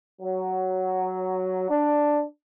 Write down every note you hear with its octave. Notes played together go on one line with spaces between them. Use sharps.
F#3
D4